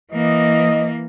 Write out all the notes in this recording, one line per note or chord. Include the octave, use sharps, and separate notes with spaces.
E3 A#3 D#5